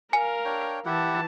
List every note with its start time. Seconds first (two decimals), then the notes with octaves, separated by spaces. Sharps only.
0.13 A#4 F5 G#5
0.45 D4 C#5 G5
0.85 E3 E4 G4 F#5 A5